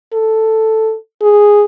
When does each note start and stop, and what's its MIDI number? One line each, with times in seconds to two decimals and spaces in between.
0.14 0.95 69
1.22 1.65 68